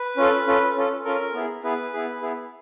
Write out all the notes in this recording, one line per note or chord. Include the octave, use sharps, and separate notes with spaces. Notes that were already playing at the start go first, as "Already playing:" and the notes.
Already playing: B4
C#4 F4 A4
C#4 F4 A4
C#4 F4 A4
C#4 F4 A4 A#4
B3 E4 G#4
B3 E4 G#4 B4
B3 E4 G#4
B3 E4 G#4